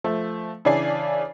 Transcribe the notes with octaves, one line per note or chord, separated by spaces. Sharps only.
F3 A3
C#3 E3 D4 D5 G#5 C7